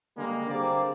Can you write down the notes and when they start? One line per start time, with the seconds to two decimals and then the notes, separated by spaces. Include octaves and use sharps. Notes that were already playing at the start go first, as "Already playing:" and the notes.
0.17 D3 G3 G#3 A#3
0.50 D3 G3 A#3 C4 G#4 D5